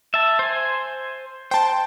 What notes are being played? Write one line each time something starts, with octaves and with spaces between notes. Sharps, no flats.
E5 A5
C5 G#5
C5 G5 A5